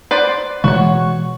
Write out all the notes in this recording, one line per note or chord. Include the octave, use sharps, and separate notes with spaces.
B4 C5 D5
B2 E3 G#3 F#4 C#5